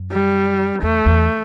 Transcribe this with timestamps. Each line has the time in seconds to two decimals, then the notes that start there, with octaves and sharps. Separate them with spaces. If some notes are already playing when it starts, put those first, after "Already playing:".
Already playing: F#2
0.13 G3
0.82 E2 A3
1.06 E2